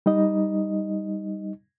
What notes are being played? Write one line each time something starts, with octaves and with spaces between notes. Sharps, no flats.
G3 D#4 D#5